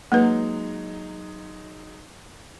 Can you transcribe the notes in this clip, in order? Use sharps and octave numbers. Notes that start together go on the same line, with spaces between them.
F#3 G#3 A#3 D#4 B4